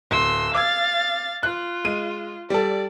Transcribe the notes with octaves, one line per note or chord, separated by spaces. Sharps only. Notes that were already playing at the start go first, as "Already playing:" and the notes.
D1 C6 E6
F5 D6 E6 G#6 A6
F4 F#6
G#3 D#7
G3 A4 D5